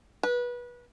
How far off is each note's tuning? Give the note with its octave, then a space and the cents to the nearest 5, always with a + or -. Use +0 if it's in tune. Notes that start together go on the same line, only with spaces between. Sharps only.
B4 -25